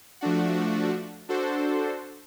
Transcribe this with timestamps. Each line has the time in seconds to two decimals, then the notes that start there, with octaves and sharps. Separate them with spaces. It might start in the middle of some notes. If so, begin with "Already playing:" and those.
0.21 F3 A3 D4 F#4
1.29 D4 F#4 A4 C5